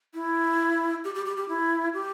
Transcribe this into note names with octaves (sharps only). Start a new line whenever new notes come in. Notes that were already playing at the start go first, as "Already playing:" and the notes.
E4
G4
G4
G4
G4
E4
G4